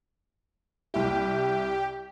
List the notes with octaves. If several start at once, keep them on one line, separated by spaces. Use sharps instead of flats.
C2 E4 G4